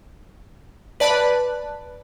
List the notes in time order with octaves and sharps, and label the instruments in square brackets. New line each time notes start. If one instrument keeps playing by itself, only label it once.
[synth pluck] B4 D5 A5 B5 F#6